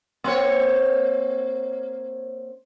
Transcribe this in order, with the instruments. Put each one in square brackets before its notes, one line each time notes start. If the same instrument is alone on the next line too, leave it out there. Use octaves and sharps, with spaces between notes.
[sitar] A#3 C4 C#5